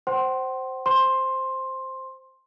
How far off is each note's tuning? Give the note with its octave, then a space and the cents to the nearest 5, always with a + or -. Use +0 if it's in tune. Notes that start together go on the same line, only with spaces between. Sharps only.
C5 +0 F#5 +45 C6 +10
C5 +0 C6 +10